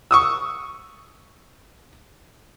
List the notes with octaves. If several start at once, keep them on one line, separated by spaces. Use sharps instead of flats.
C#6 D#6 E6